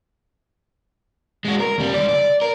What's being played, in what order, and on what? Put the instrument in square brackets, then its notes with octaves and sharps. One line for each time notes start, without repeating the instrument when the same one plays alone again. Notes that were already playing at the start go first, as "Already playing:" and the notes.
[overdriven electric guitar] G#3 F#4
A#4
D#2 G3
C#2 D5
D5
A#4